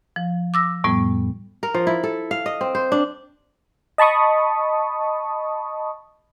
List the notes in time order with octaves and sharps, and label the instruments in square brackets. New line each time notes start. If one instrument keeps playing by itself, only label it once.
[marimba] F3
D6 E6 A#6
F2 A2 G3 B3
[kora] A#4
F3
E4
A4
F5
D#5
C4
C5
D4
[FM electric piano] D#5 A5 B5 C#6 D#6